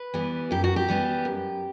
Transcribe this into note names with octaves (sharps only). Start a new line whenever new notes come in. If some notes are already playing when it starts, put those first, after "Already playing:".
Already playing: B4
E3 G3 B3
F#2 G4
F#4
G4
E3 G3 B3
F#2